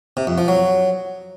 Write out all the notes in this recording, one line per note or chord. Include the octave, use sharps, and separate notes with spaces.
C3
F2
F3
F#3